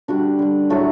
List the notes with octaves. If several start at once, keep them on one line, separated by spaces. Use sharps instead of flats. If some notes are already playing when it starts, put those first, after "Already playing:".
D3 G3 D4 F#4
D3 G3
A2 F#3 A3 F#4 A4